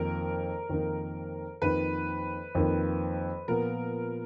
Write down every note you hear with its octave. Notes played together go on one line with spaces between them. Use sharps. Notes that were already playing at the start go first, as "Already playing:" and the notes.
Already playing: F2 D#3 A#3 D#4 A#4
F2 D#3 A#3 D#4
F2 D#3 A#3 D#4 B4
F2 D#3 A#3 D#4
A#2 F3 B3 A#4